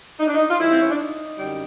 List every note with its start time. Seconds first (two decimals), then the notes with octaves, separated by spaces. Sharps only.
0.20 D#4
0.27 D4
0.35 D#4
0.50 F4
0.59 A2 E3 G3 E4
0.72 C4
0.81 C#4
0.90 D4
0.98 D#4
1.37 F#2 D3 G3